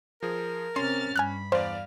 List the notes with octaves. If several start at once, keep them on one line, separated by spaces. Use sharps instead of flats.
F3 G#4 A#4
C3 C#4 C6 F6 A6
G2 G#5 B5 F6 F#6
E2 C5 D5 F5